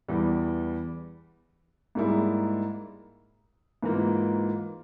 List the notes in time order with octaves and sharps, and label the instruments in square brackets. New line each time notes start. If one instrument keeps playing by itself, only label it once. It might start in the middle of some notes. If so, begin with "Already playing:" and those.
[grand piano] E2 E3 G3
G#2 G3 A#3 E4 G#4
G#2 E3 A#3 F4